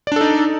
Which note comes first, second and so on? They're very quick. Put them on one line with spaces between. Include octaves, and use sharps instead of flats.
D5 D4 A4 D#4